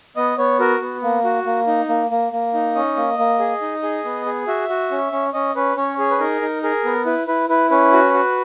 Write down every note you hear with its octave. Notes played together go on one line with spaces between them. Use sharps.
B3 D#5
B3 C#5
F#4 A#4
B3
A#3
F#4
A#3
D#4
A#3
A#3
A#3
D#4
C#4 D#5
A#3
A#3
G#4
D#4
G#4
B3
G#4
F#4 E5
F#4
C#4
C#4
C#4 D#5
C#4 B4
C#4 C#5
G#4 C#5
B4
D#4 A#4
D#4
G#4 A#4
B3
E4 B4
E4 B4
E4 B4
C#4 B4
F#4
F#4